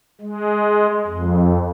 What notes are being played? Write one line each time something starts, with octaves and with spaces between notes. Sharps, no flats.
G#3
F2